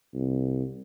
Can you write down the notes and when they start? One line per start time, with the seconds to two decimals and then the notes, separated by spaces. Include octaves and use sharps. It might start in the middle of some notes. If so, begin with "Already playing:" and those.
0.14 C2